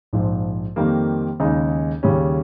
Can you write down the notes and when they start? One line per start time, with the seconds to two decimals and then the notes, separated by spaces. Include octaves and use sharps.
0.13 A#1 G#2 F3
0.76 F2 D#3 G3 A#3
1.40 D#2 C#3 G#3 D#4
2.03 D#2 C#3 G3 C#4